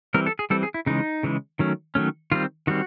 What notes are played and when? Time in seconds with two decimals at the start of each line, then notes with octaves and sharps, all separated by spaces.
0.14 E3 G3 C4 A#4
0.26 A4
0.39 G#4
0.50 E3 G3 C4 A4
0.63 G#4
0.74 E4
0.86 C#3 E3 G#3 D#4
1.23 C#3 E3 G#3
1.59 D#3 F#3 A3 C#4
1.95 D#3 F#3 A3 C#4
2.32 D#3 G3 C4 F4
2.67 D#3 G3 C4 F#4